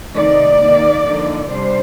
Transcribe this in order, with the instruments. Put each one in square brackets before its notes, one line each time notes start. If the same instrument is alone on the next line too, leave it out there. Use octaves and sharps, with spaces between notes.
[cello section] C3 D#3 A3 D#4 D5
D#3 A#3 D#4
D3 F3 A#3 D#4
C3 G3 D4 C5